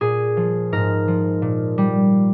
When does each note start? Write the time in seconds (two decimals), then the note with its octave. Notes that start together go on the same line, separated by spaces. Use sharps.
0.01 A#2 G#4
0.37 F3
0.72 G#2 A#4
1.08 F3
1.42 A#2
1.78 G3